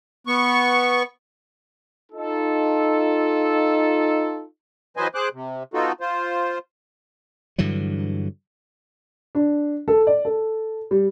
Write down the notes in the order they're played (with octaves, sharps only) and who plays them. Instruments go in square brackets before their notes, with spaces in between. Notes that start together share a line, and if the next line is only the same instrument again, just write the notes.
[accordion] B3 C#6
[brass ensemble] D#4 F4 A4
[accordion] E3 F#3 B4 C5 D#5 G#5
G#4 C5 D6 F#6
C3
B3 D#4 F4 F#4 A4
F4 C5
[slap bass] G2 D3 E3 F#3
[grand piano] D4
A4
D5
A4
G3